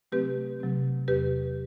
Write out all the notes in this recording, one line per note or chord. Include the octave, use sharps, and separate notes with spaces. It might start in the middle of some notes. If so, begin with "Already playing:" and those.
C3 F#3 A3 C4 G4 B4
C3 F#3 A3 C4
E2 C3 F#3 C4 G4 B4